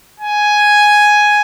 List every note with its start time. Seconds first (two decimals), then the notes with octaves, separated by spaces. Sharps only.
0.20 G#5